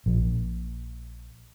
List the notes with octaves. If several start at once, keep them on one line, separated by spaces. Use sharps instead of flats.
A#1